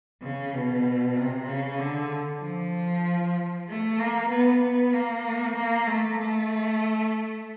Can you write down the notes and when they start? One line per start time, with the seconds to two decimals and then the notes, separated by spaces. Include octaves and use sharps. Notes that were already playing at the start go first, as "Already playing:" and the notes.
0.22 C#3
0.54 B2
1.16 C3
1.48 C#3
1.79 D3
2.42 F3
3.68 A3
3.99 A#3
4.31 B3
4.61 B3
4.93 A#3
5.56 A#3
5.87 A3
6.19 A3